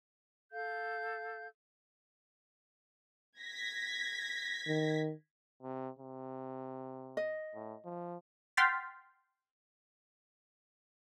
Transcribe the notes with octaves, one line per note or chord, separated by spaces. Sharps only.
A4 F5 G6
G#6 A#6 B6
D#3
C3
C3
D#5
A2
F3
F#5 G5 C6 F6 A6 B6